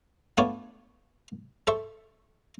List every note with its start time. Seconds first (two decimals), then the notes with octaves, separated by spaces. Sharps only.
0.37 A3 B3 D4 F4 C#5 D5
1.67 A4 C5 E5 C#6